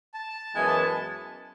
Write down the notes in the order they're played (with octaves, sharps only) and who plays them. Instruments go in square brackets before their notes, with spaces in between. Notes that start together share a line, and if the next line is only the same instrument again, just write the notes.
[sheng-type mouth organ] A5
[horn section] F#2 E3 G#3 B3 [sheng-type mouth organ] G#5
[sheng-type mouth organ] A5